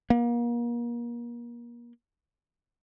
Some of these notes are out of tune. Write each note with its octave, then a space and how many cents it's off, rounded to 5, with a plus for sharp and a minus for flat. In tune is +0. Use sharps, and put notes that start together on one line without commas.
A#3 +35